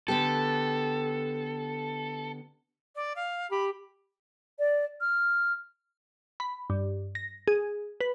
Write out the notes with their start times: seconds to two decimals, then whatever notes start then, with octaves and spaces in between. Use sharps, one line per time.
0.08 D3 B3 G4 A4
2.95 D5
3.16 F5
3.51 G4 B5
4.59 D5
5.01 F6
6.40 B5
6.70 G2
7.15 A#6
7.48 G#4
8.01 B4